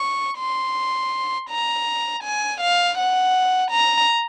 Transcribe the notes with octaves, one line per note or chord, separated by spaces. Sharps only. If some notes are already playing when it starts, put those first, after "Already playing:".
Already playing: C#6
C6
A#5
G#5
F5
F#5
A#5